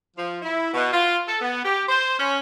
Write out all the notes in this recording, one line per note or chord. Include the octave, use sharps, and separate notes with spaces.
F3
E4
B2
F4
A4
B3
G4
C5
C#4